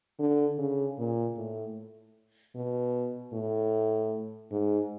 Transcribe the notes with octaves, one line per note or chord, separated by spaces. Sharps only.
D3
C#3
A#2
A2
B2
A2
G#2